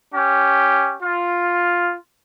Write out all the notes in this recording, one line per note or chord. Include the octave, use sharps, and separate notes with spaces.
C#4 G4
F4